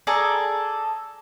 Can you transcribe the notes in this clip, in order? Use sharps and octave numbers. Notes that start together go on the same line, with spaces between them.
G#4 A4 D5 A#5